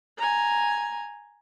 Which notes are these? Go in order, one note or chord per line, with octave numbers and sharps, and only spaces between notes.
G#5 A#5